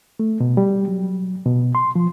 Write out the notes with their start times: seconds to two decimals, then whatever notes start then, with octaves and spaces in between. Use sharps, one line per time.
0.20 A3
0.40 B2
0.57 G3
0.88 F#3
1.46 B2
1.75 C6
1.96 F3